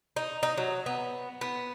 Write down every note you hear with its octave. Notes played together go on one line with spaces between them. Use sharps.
D#4
D#4
F#3
B3
B3